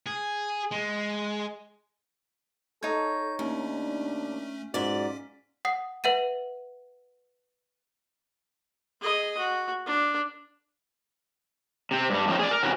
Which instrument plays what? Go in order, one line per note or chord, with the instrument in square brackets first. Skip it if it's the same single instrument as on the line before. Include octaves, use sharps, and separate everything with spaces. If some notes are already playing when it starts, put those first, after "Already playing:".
[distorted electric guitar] G#4
G#3
[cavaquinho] D#4 C#5 [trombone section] A4 [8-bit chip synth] G6
[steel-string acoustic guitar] D#2 [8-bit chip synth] A3 C#4 [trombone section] D4
[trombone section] B1 F4 F#4 [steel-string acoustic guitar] G#2 D5 [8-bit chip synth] C#4 B6
[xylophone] F#5 D#6 C7
B4 E5 F#5 A6 D#7
[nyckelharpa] G#4 D#5
F#4
D4
[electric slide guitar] C3 C4
G2 G3
A2 F3 C4 C#4 D#4
G#4 D5
A#4
C3 E3 C#4 F#4 A#4